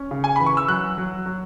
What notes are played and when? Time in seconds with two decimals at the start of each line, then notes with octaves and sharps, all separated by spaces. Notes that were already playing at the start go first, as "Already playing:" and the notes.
Already playing: C#4
0.11 C#3
0.24 G#5
0.36 E3 B5
0.46 C#6
0.57 E6
0.68 F#3 F#6
0.98 F#3
1.26 F#3